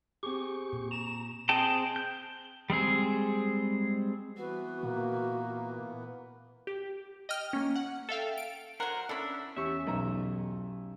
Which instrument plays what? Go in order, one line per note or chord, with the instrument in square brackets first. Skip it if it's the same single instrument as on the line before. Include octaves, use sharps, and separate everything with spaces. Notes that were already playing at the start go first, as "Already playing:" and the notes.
[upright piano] C4 G#4 [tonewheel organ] G4 C#6
[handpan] A#2
[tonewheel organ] A#5 [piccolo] E7
[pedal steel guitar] C4 G#4 D#5 G5 A5
G6
G3 G#3 C4 G#4
[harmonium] E3 B3 [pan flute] F#4
[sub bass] A#2 [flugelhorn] A#3
[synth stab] G4
D#5 G5 F6
A#3 C#4
F#5
A4 E5 F5 G5
D7
[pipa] F#3 A#4 [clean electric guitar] C5 F#5
[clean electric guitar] C#4 D4 E4 [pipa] A4 B5
[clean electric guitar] E2 E5 [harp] C#4 G4 C#6
[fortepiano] B1 A#5